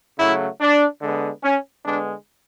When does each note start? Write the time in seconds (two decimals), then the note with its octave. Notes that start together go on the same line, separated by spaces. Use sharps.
0.19 C#3 F#3 A3 E4
0.60 D4
1.01 D3 G#3 B3
1.43 C#4
1.84 D3 G#3 B3 D4